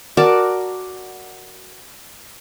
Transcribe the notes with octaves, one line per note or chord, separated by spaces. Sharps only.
F#4 A#4 D5 A5